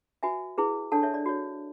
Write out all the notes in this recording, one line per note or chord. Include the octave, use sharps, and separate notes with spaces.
F#4 B4 E5 G#5
E4 G#4 B4
D4 A4 C#5 F#5 A5
C#5 E5
D5
F#4 C#5